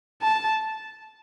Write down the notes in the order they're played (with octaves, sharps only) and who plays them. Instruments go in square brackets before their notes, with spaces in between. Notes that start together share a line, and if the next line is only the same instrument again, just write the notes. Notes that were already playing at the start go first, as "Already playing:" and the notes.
[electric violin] A5